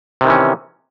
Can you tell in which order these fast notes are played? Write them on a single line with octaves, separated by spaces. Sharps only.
C3 D#3 E3 C#4